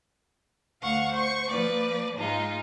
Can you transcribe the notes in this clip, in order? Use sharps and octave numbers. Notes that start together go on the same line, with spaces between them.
D2 F5 F#5 C#6
C5 C#6
F3 A#3 B4 D5
G#2 G#3 D#4 F4